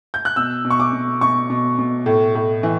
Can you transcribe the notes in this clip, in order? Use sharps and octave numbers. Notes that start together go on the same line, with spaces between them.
G6
F#6
B2 E6
B2
C#6
D6
B2
B2 C#6
B2
B2
A2
A2
E3